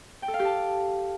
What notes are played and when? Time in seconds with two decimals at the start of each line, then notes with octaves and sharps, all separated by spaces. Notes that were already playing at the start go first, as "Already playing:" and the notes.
0.22 G5
0.28 A4
0.34 F5
0.39 G4
0.45 A5